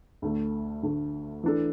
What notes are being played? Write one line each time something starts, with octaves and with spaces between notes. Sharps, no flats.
D2 D3 A3
D2 D3 A3
E3 D4 A4